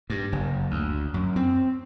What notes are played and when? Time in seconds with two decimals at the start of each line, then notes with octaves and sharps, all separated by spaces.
0.10 G2
0.32 F#1
0.71 D2
1.14 F#2
1.36 C4